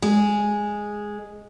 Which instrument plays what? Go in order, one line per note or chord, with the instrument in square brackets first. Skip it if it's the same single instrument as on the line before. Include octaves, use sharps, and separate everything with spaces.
[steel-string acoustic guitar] G#3 G#4